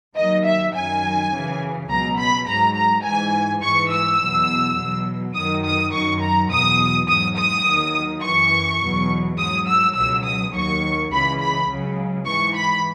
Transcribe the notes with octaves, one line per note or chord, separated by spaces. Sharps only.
D#2 D#3 F#3 D#5
E5
F#2 D#3 F#3 G#5
F#2 C#3 E3
C#2 B2 F#3 A#5
B5
G#2 F#3 A#5
A#5
G#2 E3 G#5
G#2 E3 C#6
E6
E2 B2 F#3
E2 B2 F#3
F#2 D#3 F#3 D#6
D#6
F#2 D#3 F#3 C#6
A#5
E2 B2 F#3 D#6
G#2 F#3 D#6
D#6
D#2 D#3 F#3
F#2 E3 C#6
E2 B2 F#3
G#2 F#3 D#6
E6
C#2 B2 F#3 E6
D#6
D#2 D#3 F#3 C#6
C#2 C#3 E3 B5
B5
C#2 C#3 F#3
G#2 E3 C#6
B5